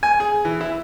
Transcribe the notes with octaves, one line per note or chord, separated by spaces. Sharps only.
G#5
G#4
E3
E4